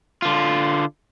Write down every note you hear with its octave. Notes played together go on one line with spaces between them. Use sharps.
D3 F4